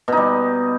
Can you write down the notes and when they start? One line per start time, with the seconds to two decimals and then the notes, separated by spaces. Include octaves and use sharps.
0.08 B2
0.12 D#4
0.17 G3